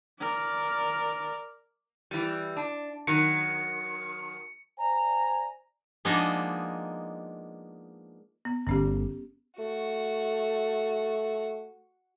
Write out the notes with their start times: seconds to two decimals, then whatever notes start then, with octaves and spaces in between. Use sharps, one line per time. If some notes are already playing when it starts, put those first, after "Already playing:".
0.20 A#4 D5
2.11 E3 G3
2.57 D4
3.07 D#3 F#3 C#7
4.78 C5 D5 G#5 A#5
6.05 F3 G#3 A#3 B3 D4 D#4
8.45 B3
8.67 G1 D3 B3 C#4 G4
9.59 A3 F#4